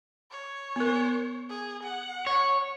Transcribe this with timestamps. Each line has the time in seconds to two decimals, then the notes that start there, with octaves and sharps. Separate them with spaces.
0.31 C#5
0.76 B3 A#4
1.49 G#4
1.83 F#5
2.27 C#5